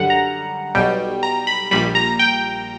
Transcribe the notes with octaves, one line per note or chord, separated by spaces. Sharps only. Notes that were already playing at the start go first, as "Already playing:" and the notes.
Already playing: F#2 D3 G3 F#5
A#5
B1 B2 G3 G5
A#5
B5
A#1 A#2 G3 B5
A#5
G5